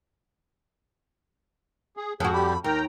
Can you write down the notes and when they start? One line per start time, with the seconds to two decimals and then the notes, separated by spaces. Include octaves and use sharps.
1.97 G#4
2.20 F2 F#4 G#4
2.33 G3 G4 B5
2.64 D#2 A#4 G5 A#5